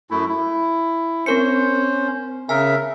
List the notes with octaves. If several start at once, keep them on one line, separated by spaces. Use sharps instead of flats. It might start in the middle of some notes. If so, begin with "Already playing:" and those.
F#2 A3 E4
E4
C4 C#4 A#4 C5 C#7
C#3 A#4 E5 G#5